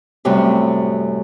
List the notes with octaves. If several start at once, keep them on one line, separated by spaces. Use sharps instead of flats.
F#2 A2 C3 F#3 G3